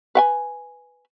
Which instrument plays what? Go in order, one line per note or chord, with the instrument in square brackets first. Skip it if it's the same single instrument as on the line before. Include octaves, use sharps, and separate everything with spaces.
[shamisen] B4 F#5 G#5